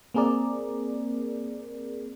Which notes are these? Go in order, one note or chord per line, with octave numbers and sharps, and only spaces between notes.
A#3 C4 G#4 A#4 D5